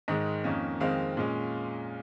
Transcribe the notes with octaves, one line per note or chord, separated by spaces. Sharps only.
G#2 D#3 G#3 D#5
F2 D#3 A#3 C#4
F2 D#3 G#3 C4 F5
A#2 G#3 C#4